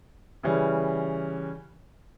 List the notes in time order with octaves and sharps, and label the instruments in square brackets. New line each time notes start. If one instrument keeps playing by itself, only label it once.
[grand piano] C#3 E3 G3 C#4